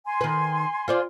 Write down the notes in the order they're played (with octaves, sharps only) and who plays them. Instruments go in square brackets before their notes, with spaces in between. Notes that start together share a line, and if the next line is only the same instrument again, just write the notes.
[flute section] G#5 C6
[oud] D#3 B4
F4 C5 D5